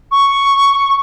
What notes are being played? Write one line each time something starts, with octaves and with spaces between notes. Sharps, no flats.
C#6